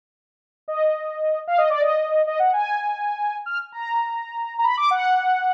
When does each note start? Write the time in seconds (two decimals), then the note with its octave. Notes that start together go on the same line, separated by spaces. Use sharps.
0.68 D#5
1.48 F5
1.58 D#5
1.70 D5
1.81 D#5
2.27 D#5
2.39 F#5
2.53 G#5
3.46 F6
3.72 A#5
4.59 A#5
4.64 B5
4.77 D6
4.91 F#5